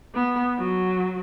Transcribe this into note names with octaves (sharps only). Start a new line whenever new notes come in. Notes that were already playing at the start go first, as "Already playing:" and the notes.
B3
F#3